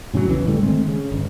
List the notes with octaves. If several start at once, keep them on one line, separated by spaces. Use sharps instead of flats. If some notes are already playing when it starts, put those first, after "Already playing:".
A2 C#3 E3 F#3
B1 E2 C#3 E3
G#2 D3 G3 A3
D#3 G#3 A3 C4
C#3
G1